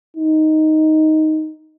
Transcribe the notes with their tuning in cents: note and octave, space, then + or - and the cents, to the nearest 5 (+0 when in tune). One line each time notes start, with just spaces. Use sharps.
D#4 +5